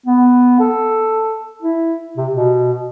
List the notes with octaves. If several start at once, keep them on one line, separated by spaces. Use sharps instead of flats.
B3
A4
E4
C3
B2